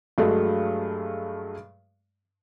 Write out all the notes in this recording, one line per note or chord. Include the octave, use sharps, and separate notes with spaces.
G2 F#3 G#3 A3